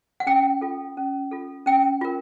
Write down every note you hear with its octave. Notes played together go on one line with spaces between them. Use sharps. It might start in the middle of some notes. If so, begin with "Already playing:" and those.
F#5
C#4 G5
F4 A4
C#4
F4 A4
C#4 G5
F4 A#4